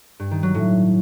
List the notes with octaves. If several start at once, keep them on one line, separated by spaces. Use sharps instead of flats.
G2
D#3
F#3
A2